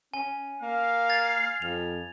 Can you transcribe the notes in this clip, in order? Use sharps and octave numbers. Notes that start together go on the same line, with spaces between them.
C#4 G#5
A#3 F5
G#6 A6
F2 F7